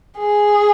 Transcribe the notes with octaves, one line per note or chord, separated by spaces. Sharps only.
G#4